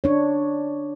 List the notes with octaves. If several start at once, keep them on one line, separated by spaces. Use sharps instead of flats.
D4 C#5